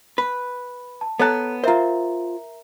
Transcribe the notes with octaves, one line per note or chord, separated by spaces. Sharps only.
B4
A5
B3 A4 C#5 A5 A#5 F#6
F4 A#4 C5 E5 A#5